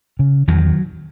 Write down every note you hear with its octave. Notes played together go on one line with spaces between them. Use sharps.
C#3
E2 D#3 F#3